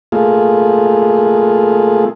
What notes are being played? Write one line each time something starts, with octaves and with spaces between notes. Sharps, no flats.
A3 A#3 F4 G#4